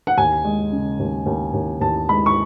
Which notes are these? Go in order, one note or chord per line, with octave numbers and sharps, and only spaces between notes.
F#5
D#2 G#5
G#3
C#3
D#2
D#2
D#2
D#2 A5
G#3 B5
C#6